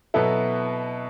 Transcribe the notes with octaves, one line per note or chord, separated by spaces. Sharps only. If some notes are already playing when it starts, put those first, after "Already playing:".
B2 F#3 B3 E4 A4